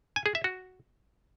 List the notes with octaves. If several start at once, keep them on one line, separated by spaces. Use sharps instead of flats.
G#5
G#4
E5
F#4